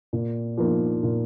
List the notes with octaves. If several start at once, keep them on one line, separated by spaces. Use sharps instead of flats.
A#2
F3 A#3 D#4
A#2